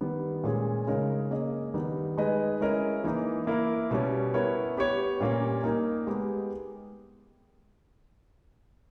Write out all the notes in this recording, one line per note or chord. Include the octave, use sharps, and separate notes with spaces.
D#3 G3 B3
A#2 G#3 C#4 G#4
C#3 G#3 D#4 A#4 C#5
A#3 C#4 G#4 D#5
D#3 G3 B3 D#4
G#3 D#4 G#4 B4 D#5
G#3 C#4 E4 A#4 D#5
E3 A#3 D#4
A#3 E4 A#4
B2 G3 C#4
B3 E4 A#4 C#5
B3 G4 C#5
A#2 G3 A#3 C#4
A#3 D#4 A#4
G#3 B3 G4